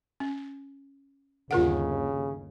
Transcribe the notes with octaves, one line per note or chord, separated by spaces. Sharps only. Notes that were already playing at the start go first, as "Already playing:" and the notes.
C#4
G1 D#2 C#3 F4 A#4 F#5